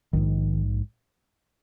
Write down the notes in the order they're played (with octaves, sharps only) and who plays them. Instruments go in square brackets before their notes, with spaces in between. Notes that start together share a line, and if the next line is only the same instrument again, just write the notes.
[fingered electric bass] A#1 G#2 D#3